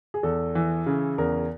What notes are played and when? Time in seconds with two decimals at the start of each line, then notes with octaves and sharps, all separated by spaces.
0.14 G#4
0.23 E2 A4
0.55 E3
0.86 C#3
1.18 E2 A#4